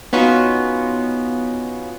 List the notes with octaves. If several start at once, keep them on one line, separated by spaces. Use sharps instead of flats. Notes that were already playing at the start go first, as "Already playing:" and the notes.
B3 C#4 D#4 F4 F#4